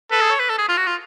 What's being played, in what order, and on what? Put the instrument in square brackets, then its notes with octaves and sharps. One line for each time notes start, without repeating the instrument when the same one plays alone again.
[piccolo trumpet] A4 [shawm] B4
[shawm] G#4
C#5
B4
A4
G#4
F4
F#4
F4